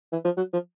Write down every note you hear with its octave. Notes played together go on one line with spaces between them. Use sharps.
E3
F3
F#3
F3